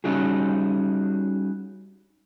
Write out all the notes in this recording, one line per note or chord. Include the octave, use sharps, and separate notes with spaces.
G3 C#4 D#4 F#4 G#4